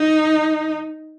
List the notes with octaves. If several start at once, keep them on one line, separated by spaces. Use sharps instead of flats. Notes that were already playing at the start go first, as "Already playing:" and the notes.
Already playing: D#4